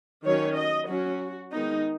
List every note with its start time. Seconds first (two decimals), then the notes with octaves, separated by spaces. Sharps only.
0.24 D#3 F#3 C#4 C#5
0.56 D#5
0.88 F#3 C#4 F#4
1.52 D#3 G#3 B3 D#4